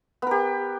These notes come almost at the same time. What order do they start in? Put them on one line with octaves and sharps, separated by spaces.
B3 A#4 G4